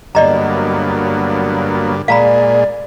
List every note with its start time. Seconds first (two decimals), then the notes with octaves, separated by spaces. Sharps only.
0.15 G2 D3 F#3 A#3 B3 D5 D#5 A#5
2.08 A#2 G#3 D5 F5 A#5 B5